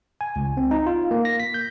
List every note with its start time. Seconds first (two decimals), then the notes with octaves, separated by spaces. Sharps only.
0.21 G#5
0.36 C#2
0.57 C4
0.71 D#4
0.86 F4
1.11 A#3
1.25 A#6
1.40 B6
1.54 G6